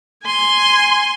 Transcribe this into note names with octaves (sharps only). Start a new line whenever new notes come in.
G#5 C6